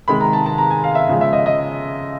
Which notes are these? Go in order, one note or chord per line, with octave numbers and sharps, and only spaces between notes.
C3 D#3 G#3 B5
A#5
A5
A5
A#5
G#5
F5
E5
C#3 F3 G#3
E5
D#5
D#5